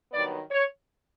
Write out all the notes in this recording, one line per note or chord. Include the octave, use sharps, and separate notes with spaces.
G2 D#3 F#3 B3 D5
C#5